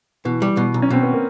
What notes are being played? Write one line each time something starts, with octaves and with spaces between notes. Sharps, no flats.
B2 E3
G3
B2
B1
C#4
B2 C4
B3
A#3